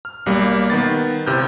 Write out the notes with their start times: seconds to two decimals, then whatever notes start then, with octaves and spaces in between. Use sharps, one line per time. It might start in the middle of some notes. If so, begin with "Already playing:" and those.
0.05 F6
0.26 B1 G3 A#3
0.70 D#3 B3 A6
1.26 G1 C3 E4 F6 G6